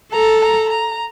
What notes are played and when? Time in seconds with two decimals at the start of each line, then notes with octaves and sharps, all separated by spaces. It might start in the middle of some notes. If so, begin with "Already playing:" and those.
0.13 A4 A#5
0.42 A#5
0.70 A#5